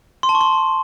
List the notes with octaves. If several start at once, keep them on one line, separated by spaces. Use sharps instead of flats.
C6
A5
C#6
C6